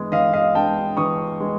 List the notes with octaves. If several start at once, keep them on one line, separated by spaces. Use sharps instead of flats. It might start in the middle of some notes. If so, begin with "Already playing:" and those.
Already playing: E3 G#3 B3
E3 D#5 F5
D#5 F5
G#3 B3 G5 A5
E3 C#6 D#6
G#3 B3